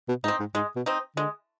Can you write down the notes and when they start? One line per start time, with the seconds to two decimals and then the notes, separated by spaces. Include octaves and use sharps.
0.08 B2
0.24 G#2 C4 D#4
0.40 G#2
0.55 G#2 G#3
0.76 B2
0.86 C4 D#4
1.16 D3 G#3